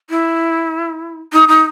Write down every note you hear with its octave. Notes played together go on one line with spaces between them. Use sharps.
E4
D#4
D#4